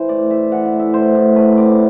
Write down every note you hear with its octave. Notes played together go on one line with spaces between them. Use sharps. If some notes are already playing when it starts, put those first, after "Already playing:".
Already playing: E3 C5
A2 D5
A2 E5
E3 F#5
F#5
A2
E5
A2 C5
A2
A3 B4
C4 D5